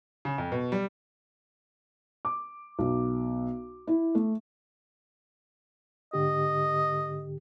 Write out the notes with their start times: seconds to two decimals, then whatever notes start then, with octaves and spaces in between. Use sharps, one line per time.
0.25 C#3
0.38 F2
0.52 B2
0.72 G3
2.25 D6
2.79 B1
3.87 E4
4.15 A3
6.13 G#2 D3 G4 D#5